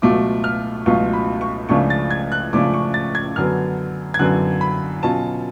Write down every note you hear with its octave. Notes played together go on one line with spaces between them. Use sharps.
C#2 B2 F#3 A3 F4 D6
F6
C#2 B2 F#3 A3 F4 C#6
B5
C#6
C#2 C#3 F3 A3 D4 C#6
A6
G#6
F#6
C#2 C#3 F3 A3 D4 D6
C#6
A6
G#6
F#2 D3 F#3 B3 F6
G#6
F#2 D3 F#3 B3 F#6
B5
B2 F#3 C#4 F4 A5